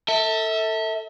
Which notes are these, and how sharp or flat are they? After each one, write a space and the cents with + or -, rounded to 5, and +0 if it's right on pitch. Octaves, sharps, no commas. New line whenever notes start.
A4 +25 E5 -30